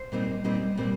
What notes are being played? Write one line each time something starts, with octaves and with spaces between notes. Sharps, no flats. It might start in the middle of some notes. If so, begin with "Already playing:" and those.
Already playing: C5
A#2 G3 C4 D#4
A#2 G3 C4 D#4
A#2 G3 C4